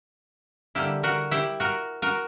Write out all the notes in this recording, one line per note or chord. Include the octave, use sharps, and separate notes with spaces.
D3 G3 A#3 E4 G4
F#4 A#4
E4 G4
F#4 A#4
F#4 A#4